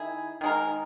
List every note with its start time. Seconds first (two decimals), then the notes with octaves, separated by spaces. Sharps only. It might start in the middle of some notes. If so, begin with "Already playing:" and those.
Already playing: D#3 E4 G#4
0.41 D#3 G#3 D#4 A#4